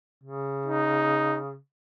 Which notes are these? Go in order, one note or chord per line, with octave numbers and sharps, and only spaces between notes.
C#3
D#4